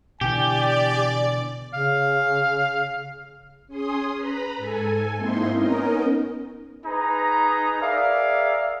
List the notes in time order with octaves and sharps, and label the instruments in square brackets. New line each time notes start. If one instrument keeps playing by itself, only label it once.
[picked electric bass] B2 D3 E3 [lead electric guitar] G4 [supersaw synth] D5 [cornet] G#5
[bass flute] C#3 [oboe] F5
[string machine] C#4 G#4 C6 D#6
B4 A#5 B5
G#2 A4 G#5
G#2 A#3 C4 D#4 E4 C6
B3 C#4 D#4 A#4 D#5
[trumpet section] D#4 G#4 B4 A#5
G#4 A#4 D5 E5 F5